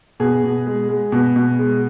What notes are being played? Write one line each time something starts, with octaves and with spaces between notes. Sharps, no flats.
B2 G#4
B2
G#3
G#3
B2
B2
G#3